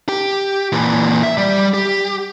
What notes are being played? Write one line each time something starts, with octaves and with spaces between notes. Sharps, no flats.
G4
A#2 E3
E5
G3
G4